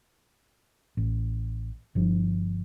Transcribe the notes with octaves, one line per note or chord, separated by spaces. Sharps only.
A1
G1 F3 D4